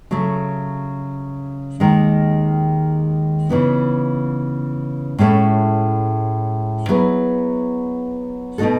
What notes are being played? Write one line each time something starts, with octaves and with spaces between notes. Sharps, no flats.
C#3 F#3 A3
D#2 D#3 G#3
C#3 E3 B3 D#4
A2 G#3 C#4 E4 A4
F#3 B3 E4 G#4 B4
B2 A3 D#4 F#4 A4